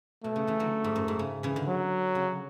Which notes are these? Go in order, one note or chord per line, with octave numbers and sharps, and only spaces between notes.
B2 A3
C#3
C#3 E3
D3 F#3
G#2
F#2
G#2
C#3
C#3 E3
D3
F#3
C#3